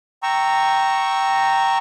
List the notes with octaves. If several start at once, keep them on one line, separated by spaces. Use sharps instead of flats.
G5 A#5 C#6 E6